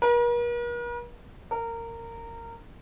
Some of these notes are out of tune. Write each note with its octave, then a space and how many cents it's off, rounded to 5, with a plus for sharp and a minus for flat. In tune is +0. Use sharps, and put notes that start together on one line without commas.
A#4 +45
A#4 -20